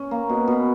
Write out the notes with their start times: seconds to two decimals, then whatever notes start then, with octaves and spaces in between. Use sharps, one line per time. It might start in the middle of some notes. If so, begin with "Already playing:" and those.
Already playing: C#4
0.11 A#3
0.29 B2
0.48 B2